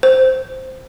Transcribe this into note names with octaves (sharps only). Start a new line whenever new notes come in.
C5